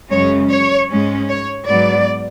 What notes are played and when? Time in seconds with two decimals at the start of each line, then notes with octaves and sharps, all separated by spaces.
0.10 F#2 C#3 G#3 C#4 C#5
0.50 C#5
0.90 G#2 G#3 C#4
1.29 C#5
1.67 G#2 F#3 B3 D5